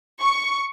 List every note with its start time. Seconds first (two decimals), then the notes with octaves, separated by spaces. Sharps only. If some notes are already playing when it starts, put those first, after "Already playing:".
0.21 C#6